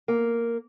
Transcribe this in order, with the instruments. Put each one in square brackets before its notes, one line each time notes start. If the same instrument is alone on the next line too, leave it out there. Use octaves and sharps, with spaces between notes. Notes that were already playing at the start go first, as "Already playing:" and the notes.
[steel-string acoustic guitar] A#3